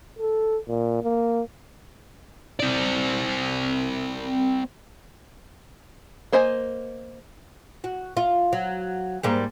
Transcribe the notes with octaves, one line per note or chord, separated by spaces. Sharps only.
A4
A#2
A#3
C4 D5
A#3 C5 D#5 G#5
F#4
F4
F#3
G#2 G3 A#3